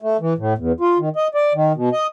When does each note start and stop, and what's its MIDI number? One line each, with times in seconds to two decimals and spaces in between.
0.02 0.17 57
0.21 0.33 52
0.38 0.53 45
0.58 0.72 40
0.80 0.98 65
0.98 1.09 51
1.16 1.28 75
1.35 1.53 74
1.54 1.72 51
1.75 1.89 47
1.92 2.07 75